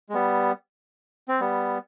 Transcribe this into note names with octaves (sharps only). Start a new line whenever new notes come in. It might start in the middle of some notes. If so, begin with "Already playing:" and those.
G#3
G3 B3
C4
G3 B3